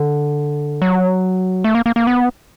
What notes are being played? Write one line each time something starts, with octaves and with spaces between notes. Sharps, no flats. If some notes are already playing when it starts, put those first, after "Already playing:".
Already playing: D3
F#3
A3
A#3
A#3
A#3
B3